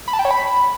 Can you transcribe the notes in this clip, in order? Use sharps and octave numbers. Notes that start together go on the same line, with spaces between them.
B5
A5
G5
C#5
B5